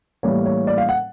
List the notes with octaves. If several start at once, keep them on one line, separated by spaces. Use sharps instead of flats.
A2 E3 G3 A#3 C#5
C#5
D5
F5
F#5